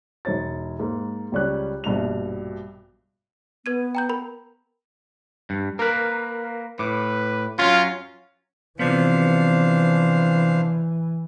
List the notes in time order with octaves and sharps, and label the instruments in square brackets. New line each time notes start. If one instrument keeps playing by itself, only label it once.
[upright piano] E1 D#4 C#5 A6
G#2 A#3
C#2 G3 C#4 F#6
A#1 G2 B2 F7
[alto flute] B3 [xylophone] B4 G#6 D#7
[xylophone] G5 A#5 G6
A#4 B5
[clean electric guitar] G2
[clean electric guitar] A#3 B4 [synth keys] A#4
[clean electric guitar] A2 [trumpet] B4 [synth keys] D6
[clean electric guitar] F#3 C#4 [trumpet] F4 [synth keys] C6 F6
[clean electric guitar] C3 F3 B3 [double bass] E3 [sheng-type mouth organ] D4 C5 F5